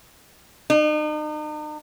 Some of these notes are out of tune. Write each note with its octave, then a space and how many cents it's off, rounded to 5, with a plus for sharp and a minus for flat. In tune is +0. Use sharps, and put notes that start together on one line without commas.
D#4 -40